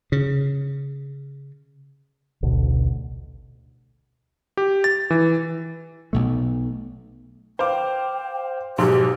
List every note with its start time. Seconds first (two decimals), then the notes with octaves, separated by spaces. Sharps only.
0.12 C#3
2.43 A1 D2 B2 D3
4.57 G4
4.84 A6
5.10 E3
6.13 B1 B2 A3
7.59 C5 F5 G5 D6
8.78 B1 G#2 F#3 G4